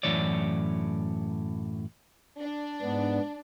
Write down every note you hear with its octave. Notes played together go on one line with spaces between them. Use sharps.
F#2 A2 E3 C#5 D5
D4
G#2 B3